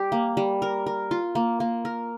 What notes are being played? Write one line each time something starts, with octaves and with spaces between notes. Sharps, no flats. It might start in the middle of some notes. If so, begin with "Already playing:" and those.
Already playing: G3 G4
A#3
G3
A#4
A#4
F4
A#3
A#3
A#4